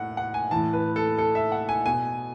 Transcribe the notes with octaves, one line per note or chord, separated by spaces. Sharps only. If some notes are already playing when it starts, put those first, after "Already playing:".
Already playing: A2 F#5
F#5
G#5
A2 E3 A5
B4
A4
A4
E5
F#5
G#5
B2 G#5